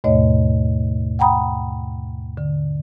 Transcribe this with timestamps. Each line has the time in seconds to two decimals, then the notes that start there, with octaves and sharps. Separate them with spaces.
0.04 D#2 G#2 B2 A3 C#5 D#5
1.19 F#5 G5 A#5 B5 D#6
2.37 D3